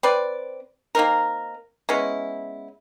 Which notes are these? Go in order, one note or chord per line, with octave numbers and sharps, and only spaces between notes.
C4 B4 D5
A#3 C4 D#4 A#4
G#3 B3 C#4 E4